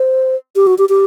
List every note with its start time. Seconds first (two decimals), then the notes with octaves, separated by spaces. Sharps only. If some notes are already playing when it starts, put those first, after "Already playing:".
Already playing: C5
0.56 G4
0.67 F#4
0.78 G4
0.89 G4